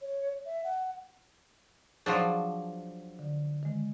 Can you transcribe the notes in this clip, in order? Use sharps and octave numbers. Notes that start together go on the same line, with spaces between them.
C#5
E5
F#5
F3 F#3 D4 G#4 C5
D3
D#3 G#3